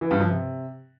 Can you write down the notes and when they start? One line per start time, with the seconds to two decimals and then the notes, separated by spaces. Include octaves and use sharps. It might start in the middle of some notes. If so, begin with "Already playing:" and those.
0.01 E3
0.11 G2
0.20 F3
0.30 C3